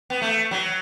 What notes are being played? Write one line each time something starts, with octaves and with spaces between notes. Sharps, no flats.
B3
A3
F#3